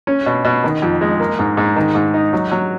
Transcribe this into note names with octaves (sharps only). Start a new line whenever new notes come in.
C#4
B2
B2
D#3
F2
G#3
A#3
G#2
G#2
D#3
G#2
D#4
F#3
F#3